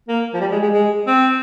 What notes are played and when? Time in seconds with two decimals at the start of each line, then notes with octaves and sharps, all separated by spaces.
0.08 A#3
0.34 F3
0.41 G3
0.51 G#3
0.62 G#3
0.74 G#3
1.07 C4